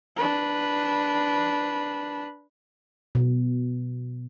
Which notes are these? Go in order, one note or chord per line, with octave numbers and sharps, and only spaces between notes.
D4 B4
B2